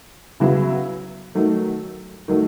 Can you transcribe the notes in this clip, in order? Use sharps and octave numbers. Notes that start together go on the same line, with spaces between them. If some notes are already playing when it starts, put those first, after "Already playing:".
C#3 F#3 B3 E4
D#3 F#3 A3
D#3 F#3 A3